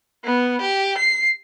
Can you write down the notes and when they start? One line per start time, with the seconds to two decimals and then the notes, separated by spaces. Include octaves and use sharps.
0.24 B3
0.61 G4
0.98 C7